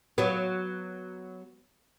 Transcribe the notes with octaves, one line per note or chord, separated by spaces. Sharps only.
F#3 B3